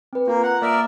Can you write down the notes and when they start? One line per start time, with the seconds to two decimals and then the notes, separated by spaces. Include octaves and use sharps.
0.13 C4 B4
0.28 A#3 F4
0.43 F#5 A#5
0.62 A#3 A#4 D5 E5